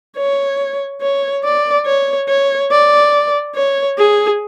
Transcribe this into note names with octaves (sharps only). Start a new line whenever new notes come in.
C#5
C#5
D5
C#5
C#5
D5
C#5
G#4